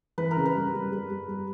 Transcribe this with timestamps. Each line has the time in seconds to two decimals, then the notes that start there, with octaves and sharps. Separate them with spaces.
0.18 E3 B4
0.31 A#4
0.37 C#3
0.46 B4
0.55 G3
0.74 G3
0.92 G3
1.11 G3
1.28 G3